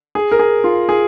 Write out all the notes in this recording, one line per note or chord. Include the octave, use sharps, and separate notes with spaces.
G#4
A#4
G#4
F4
G#4